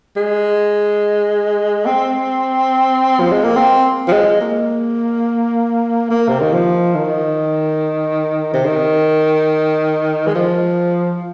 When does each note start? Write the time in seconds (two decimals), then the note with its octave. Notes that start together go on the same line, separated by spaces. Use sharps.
0.16 G#3
1.86 C4
3.20 F3
3.32 G#3
3.44 A#3
3.56 C4
4.08 F3
4.13 G#3
4.41 A#3
6.10 A#3
6.28 C3
6.41 D#3
6.53 F3
6.95 D#3
8.54 C3
8.65 D#3
10.27 G#3
10.35 F3